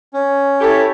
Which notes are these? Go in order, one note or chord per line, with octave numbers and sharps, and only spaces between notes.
C#4
E4 G4 A4 C#5